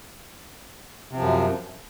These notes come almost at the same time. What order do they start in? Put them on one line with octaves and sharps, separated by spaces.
C3 F3 F#2